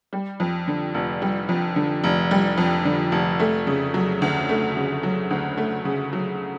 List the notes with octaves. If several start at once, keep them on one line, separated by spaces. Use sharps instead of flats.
G3
F2
D3
F1
G3
F2
D3
F1
G3
F2
D3
F1
A3
C#3
F#3
D2
A3
C#3
F#3
D2
A3
C#3
F#3